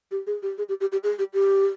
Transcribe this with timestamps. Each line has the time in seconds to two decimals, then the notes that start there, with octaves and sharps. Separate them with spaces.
0.11 G4
0.27 G#4
0.43 G4
0.58 G#4
0.69 G4
0.81 G4
0.92 G4
1.03 G#4
1.19 G4
1.34 G4